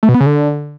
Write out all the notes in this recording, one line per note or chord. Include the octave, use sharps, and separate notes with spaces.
A3
B2
B3
C#3
D3